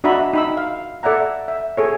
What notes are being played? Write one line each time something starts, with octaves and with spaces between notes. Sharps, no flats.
D4 F#4 D#5 E5 A#5 B5
D#4 B5 E6
F5
A4 D5 E5 F#5 A#5
E5
G#4 A4 C#5